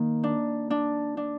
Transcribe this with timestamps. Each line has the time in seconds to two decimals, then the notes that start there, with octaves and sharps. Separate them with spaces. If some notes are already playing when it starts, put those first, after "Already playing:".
Already playing: D#3 A#3
0.24 D4
0.70 D4
1.17 D4